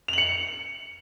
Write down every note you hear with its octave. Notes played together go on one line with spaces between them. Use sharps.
C#7 F7 F#7